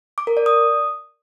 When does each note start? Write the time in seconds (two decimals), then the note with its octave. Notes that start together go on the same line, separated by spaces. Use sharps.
0.18 D6
0.27 A#4
0.37 D5
0.46 D#6